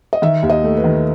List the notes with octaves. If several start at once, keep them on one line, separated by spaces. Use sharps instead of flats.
D#5
D#3 E5
D#2
D#5
A3
B4
D#3